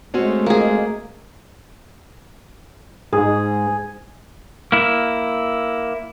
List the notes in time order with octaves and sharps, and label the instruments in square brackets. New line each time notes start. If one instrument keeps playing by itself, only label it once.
[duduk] G#3 [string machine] A3 [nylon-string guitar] C4 C#4 F#4
[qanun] A#3 G#4
[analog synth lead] G#2 [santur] G#4
[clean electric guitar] A#3 E4